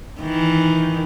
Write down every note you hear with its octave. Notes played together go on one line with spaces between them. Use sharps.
D#3 E3